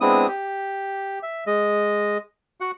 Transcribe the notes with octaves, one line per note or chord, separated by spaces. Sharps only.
G#3 B3 C4 D4 E4 D#6
G4
E5
G#3 D#5
F#4 F#5